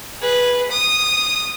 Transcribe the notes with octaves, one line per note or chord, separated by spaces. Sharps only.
G#4 B4
D#6